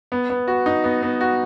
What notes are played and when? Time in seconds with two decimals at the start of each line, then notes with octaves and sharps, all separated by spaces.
0.12 B3
0.30 B3
0.48 F#4
0.66 D#4
0.84 B3
1.03 B3
1.21 F#4